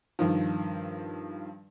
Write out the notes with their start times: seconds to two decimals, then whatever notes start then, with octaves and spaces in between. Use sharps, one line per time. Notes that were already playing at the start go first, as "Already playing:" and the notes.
0.19 G2 D#3 F3